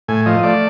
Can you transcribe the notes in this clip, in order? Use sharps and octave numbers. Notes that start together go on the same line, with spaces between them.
A2 G#5
F3 D#5
A3 D5